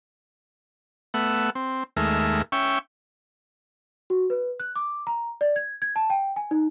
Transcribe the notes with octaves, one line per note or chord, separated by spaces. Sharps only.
A3 B3 E5 F#5
C4
D#2 G#3 A3 A#4 E5
C#4 E5 G5 C#6
F#4
B4
F#6
D6
A#5
D5
G#6
G#6
A5
G5
G#5
D#4